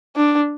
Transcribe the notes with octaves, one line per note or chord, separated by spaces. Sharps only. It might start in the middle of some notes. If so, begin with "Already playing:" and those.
D4